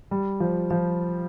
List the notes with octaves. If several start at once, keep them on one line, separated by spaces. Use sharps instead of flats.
G3
F3
F3